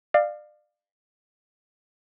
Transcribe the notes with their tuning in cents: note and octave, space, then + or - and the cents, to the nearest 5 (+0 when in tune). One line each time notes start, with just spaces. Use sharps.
D5 +35 F5 +0